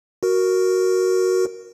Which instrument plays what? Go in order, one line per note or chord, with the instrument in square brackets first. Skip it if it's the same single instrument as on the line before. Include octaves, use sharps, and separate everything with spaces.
[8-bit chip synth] F#4 A#4